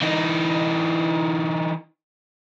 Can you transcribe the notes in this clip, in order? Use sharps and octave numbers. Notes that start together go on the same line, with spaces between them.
E3 D#4